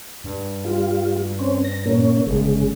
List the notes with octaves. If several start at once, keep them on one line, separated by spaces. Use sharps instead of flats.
G2
G3 F4
C4 C#4
A#6
A#2 A#3 C#4
G1 C#3 G#3